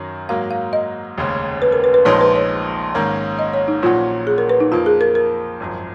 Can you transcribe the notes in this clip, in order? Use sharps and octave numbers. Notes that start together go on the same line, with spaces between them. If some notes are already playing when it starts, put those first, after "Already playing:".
Already playing: F#2 D#3 F#3 C#4
G#2 F#3 A#3 F5
F5
D#5
F1 D#2 C#3 G#3 C#4
B4
A#4
B4
B4
A#1 A#2 F3 G#3 D#4 C#5
B4
C#5
G#2 D#3 A#3 C#4
D#5
C#5
D#4
A#1 A#2 F#3 C#4 F4 F#4
G#4
A#4
B4
D#4
F2 F3 A#3 F4
G#4
A#4
A#4
G#1 F#2 F3